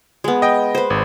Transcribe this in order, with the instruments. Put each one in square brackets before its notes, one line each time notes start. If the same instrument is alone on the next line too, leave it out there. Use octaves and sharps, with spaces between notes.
[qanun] G#3 B3
[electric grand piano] D#5 G5
[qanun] B4 C5
[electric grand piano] G#1